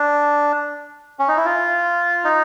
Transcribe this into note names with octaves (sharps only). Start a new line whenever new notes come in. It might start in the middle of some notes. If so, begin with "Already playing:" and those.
Already playing: D4
C#4
D#4
E4
F4
D#4